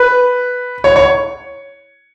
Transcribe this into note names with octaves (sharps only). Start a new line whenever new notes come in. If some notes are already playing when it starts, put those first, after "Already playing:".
Already playing: B4
C#5
C#5